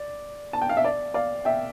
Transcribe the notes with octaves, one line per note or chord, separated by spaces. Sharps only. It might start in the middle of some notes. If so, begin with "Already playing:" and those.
Already playing: D5
A5
G5
F5
E5
D5
D5 F5
E5 G5